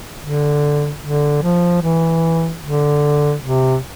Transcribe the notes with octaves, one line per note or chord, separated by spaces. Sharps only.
D3
D3
F3
E3
D3
C3